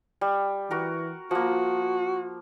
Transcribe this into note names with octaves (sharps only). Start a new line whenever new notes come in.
G3
E3 F#4 A#4
F3 A#3 F#4